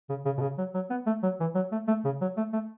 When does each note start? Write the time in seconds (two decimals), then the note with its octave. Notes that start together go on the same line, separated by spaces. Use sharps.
0.09 C#3
0.25 C#3
0.38 B2
0.41 C#3
0.58 F#3
0.75 F#3
0.90 B3
1.06 A3
1.23 F#3
1.40 E3
1.55 F#3
1.72 A3
1.88 A3
2.05 C#3
2.21 F#3
2.37 A3
2.53 A3